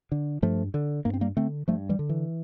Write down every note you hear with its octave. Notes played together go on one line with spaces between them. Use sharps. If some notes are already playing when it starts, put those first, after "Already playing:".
D3
G2 F3 A3
D3
G2 A#3
C4
G3 A#3
D3 A3 C4
G2 F3 A3
E3 G3
D3
E3